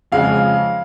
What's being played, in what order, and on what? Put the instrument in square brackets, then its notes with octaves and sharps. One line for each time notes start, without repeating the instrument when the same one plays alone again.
[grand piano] F2 C#3 F3 G#3 [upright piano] F5